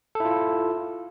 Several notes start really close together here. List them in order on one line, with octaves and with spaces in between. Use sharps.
A4 E4 F4